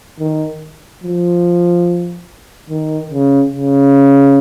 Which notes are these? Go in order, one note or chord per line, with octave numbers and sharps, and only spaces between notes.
D#3
F3
D#3
C#3
C#3